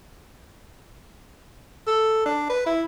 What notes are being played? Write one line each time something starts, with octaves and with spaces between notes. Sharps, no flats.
A4
D4
B4
E4